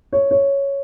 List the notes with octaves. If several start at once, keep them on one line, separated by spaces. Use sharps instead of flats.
C#5
C#5